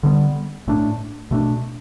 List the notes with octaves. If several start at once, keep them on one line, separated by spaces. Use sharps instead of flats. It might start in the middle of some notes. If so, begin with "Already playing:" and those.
D3 G3 B3
A2 A3 D4
B2 A3 D4